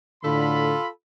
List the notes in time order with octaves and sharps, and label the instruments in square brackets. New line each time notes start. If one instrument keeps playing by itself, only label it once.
[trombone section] A2 D3 [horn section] F4 A4 B5